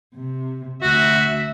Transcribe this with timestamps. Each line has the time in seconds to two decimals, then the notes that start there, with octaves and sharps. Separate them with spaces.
0.15 C3
0.82 D2 F#4 E5